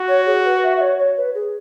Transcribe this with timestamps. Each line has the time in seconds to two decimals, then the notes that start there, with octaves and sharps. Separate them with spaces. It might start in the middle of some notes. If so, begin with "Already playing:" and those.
Already playing: F#4
0.08 C#5
0.26 G#4
0.45 B4
0.63 E5
0.77 E5
0.81 C#5
0.99 C#5
1.17 B4
1.35 G#4